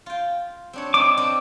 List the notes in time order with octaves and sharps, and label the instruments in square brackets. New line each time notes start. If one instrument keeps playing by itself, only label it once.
[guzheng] F4 G5
C4 D4 C#5
[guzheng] C4 D#4 [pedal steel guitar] D6
[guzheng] C4 D4 A#4